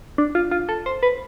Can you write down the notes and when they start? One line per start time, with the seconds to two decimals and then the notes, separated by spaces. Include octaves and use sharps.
0.18 D4
0.35 F4
0.51 F4
0.69 A4
0.86 C5
1.03 B4